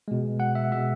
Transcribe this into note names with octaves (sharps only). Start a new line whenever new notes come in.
B2 G#3
F#5
E5
B2 G#3 E5